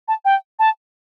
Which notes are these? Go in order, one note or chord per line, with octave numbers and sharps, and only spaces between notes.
A5
G5
A5